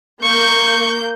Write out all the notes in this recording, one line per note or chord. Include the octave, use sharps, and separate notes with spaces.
A#3 C#6 G6